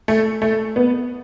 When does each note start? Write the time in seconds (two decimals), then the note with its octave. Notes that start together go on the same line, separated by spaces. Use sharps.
0.08 A3
0.42 A3
0.76 B3